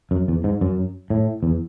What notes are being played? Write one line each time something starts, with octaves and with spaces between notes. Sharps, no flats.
F#2
E2
G#2
F#2
A2
E2